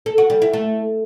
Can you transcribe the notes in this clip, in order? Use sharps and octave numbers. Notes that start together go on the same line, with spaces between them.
A4
F#4
G3
E4
A3